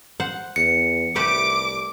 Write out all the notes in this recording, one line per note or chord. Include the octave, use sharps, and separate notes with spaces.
C5 F#5
E2 C#7
C2 A3 G4 B4 D6 D7